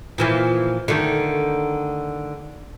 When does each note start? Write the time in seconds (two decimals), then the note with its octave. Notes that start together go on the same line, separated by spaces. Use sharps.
0.18 A#2 E3 F3
0.88 D3 D#3 A3